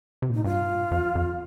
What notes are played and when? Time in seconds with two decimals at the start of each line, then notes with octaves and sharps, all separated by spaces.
0.22 C3
0.30 A#2
0.34 A2 D#4
0.44 G2 F4
0.91 F2
1.15 F2